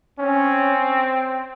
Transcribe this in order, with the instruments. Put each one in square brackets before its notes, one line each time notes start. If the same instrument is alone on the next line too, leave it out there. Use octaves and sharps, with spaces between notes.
[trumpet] C4 [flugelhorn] C#4